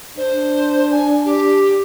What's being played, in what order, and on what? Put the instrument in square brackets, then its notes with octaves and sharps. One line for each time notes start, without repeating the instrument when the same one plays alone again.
[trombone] D4 [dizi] C5
[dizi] G#5
G4